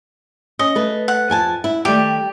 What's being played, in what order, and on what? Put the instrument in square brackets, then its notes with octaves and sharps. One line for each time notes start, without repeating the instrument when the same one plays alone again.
[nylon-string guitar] C#4 [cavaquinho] D#5
[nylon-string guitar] A3 B4
[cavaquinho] F#5
[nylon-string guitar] F2 G#5 A5
E4
[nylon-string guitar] D#3 G3 A3 [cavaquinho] G4